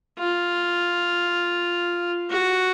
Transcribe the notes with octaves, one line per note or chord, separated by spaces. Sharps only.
F4
F#4